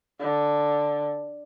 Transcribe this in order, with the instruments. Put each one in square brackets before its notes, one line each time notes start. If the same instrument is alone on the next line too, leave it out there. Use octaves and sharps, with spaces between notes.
[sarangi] D3